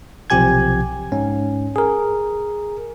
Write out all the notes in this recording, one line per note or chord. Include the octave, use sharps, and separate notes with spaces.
B1 C3 F3 G4 G#5 G#6
G#2 C#4
G#4 A#4